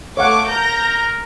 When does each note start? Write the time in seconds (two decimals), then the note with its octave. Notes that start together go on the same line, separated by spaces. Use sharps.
0.17 A3 C#5 F5 F#5 C#6 D6
0.50 A#4 A#5 G6 A#6